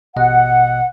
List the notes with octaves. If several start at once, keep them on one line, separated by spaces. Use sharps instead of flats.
A1 B2 D#5 F#5